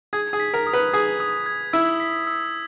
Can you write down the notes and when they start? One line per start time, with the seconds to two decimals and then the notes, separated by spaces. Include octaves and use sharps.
0.13 G#4 G#6
0.33 G#4
0.40 B6
0.54 A#4
0.67 D#6
0.73 B4
0.93 G#4 G#6
1.20 D#6
1.46 G#6
1.73 E4 E6
2.00 B6
2.27 E6